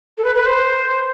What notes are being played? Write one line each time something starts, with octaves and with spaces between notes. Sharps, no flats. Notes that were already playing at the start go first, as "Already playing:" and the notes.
A4
B4
B4
C5